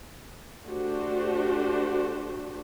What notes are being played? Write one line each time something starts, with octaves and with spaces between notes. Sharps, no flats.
A3 D4 F#4 G4 C5